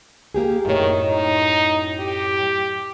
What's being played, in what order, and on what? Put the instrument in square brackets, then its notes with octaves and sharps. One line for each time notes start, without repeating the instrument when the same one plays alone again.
[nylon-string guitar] A#3 G4 G#4
[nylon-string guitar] F#2 A2 C#5 [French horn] D#3
[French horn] D#4
G4